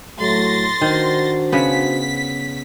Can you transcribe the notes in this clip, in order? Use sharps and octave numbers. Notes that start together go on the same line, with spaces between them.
A2 F#3 A3 C6 A6 A#6
D#3 D4 F#4 C5
C#3 B3 B6